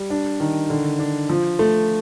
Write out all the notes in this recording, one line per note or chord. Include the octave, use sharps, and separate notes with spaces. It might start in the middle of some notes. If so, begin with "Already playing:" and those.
Already playing: G3
D4
D#3
D3
D4
F3
A3